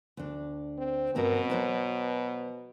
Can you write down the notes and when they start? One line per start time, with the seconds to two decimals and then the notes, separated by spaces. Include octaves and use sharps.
0.17 D2 D4
0.78 C4
1.15 G2 B2 C4 A#4
1.50 F#3 C5 A#5